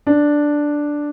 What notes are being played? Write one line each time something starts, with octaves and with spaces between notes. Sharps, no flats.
D4